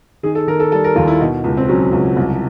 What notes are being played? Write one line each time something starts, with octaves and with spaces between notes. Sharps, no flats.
D#3 G#4
A4
D#3 A#4
A4
G3 A4
A#4
D#2 F4
E4
B2 D#4
C#2
C4
F#3 C#4
C#2
C2